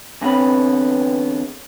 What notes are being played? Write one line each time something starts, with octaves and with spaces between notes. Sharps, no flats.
E2 D3 B3 C4 C#5 B5